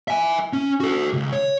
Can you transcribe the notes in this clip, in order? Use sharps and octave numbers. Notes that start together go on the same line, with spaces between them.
E5 G#5
C#4
F#4 A4
C#2
C#5